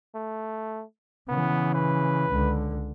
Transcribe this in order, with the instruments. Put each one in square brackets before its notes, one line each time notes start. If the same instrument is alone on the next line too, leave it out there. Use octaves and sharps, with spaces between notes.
[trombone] A3
[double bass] C#3 E3 [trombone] B3
[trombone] B4
[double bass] C#2 D3